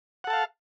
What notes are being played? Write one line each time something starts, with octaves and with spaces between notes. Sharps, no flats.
A4 F5 F#5 A5